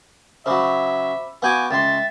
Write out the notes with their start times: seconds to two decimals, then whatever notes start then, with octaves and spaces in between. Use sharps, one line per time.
0.46 C#3 F#3 C5 E5 B5 D6
1.42 B3 F#4 F5 G#5 D6 G6 G#6
1.71 C#2 E5 G5 C6 A6